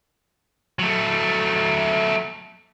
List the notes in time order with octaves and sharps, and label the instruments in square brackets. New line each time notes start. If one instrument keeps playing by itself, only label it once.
[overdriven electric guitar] F#3 A3